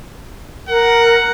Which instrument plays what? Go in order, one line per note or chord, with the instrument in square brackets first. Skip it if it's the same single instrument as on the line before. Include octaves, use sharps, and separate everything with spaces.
[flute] A#4 [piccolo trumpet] F#5